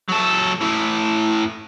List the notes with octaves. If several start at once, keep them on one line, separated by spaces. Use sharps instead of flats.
F#3 A4
A2 E3